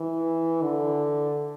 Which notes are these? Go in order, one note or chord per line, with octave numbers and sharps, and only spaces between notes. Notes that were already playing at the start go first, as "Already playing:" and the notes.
Already playing: E3
D3